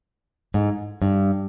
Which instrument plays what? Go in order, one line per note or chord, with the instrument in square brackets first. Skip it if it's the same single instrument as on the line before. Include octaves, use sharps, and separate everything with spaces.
[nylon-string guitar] G#2
G2